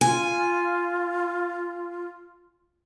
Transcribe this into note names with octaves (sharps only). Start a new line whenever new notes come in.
F4 G#5